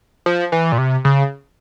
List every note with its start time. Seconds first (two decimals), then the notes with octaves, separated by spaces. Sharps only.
0.26 F3
0.52 E3
0.72 A#2
0.78 C3
1.05 C#3